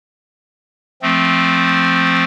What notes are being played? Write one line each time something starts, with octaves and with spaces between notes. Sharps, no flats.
F3 A3 C4